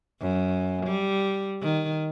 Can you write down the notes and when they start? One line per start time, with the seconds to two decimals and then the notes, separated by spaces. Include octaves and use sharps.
0.21 F#2
0.87 G3
1.62 D#3